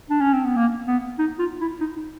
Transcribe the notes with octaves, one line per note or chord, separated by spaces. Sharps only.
D4
C#4
C4
B3
A#3
B3
D#4
F4
E4
D#4
D#4